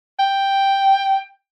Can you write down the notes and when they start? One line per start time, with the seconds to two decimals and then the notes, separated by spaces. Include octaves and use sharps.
0.19 G5